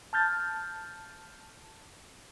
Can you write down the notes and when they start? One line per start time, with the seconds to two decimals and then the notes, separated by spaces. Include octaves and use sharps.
0.13 A5 F6 G6 A6